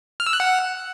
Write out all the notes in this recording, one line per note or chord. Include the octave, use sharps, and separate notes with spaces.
F6
E6
F#6
F#5